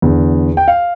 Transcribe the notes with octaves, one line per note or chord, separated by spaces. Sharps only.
E2 D3
G5
F5